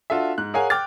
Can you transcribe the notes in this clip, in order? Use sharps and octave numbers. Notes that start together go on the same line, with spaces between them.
D4 F4 F#4 A4 E5
G#2 F#6
G#4 A#4 C#5 F5 F#5 G#5
G5 D6 F6 A6